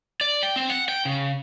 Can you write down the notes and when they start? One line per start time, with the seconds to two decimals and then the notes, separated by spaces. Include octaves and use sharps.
0.21 D5
0.43 G5
0.56 C4
0.70 F#5
0.89 G5
1.05 C#3